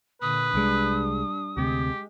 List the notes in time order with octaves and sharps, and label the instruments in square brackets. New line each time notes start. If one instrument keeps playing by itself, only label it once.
[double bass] A#2 D3 [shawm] B4 [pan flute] D#6
[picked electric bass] C2 G#3 [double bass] G3 D4
[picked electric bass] D2 C3 [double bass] G#3 [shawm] G4